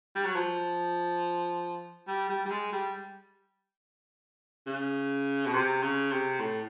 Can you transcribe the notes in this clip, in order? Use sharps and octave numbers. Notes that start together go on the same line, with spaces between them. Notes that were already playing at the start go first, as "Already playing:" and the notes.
G3
F#3
F3
G3
G3
G3
G#3
G3
C#3
B2
C3
C#3
C3
A2